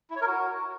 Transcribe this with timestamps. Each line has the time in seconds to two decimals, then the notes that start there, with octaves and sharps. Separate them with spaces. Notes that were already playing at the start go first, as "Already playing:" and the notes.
0.10 E4
0.16 C#5
0.22 A#4
0.27 F#4